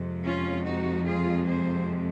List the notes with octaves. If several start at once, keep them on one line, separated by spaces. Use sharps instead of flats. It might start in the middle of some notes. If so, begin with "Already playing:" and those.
Already playing: F2 C3 F3 G#3
C#4 F4
D#4 F#4
F4 G#4
G#4 C5